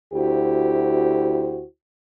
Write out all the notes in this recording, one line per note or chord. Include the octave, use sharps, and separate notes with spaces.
D2 E4 F#4 G4 C5